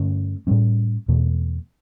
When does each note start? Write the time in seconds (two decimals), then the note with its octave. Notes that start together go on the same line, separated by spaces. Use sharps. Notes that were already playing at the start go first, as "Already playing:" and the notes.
Already playing: G2 D3 A3 C#4
0.47 A2 G3 C#4
1.08 E2 B2 A3